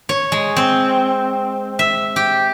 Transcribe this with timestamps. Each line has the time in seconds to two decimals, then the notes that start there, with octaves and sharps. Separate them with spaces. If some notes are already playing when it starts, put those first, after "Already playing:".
0.09 C#5
0.32 G#3
0.56 C4
1.79 E5
2.16 G4